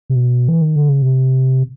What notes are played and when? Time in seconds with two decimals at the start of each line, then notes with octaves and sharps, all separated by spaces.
0.10 C3
0.16 B2
0.48 E3
0.62 D#3
0.76 D3
0.89 C#3
1.02 C3